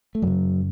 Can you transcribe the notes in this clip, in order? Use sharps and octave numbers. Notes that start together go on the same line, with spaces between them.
A3
F#2 C#3 F#3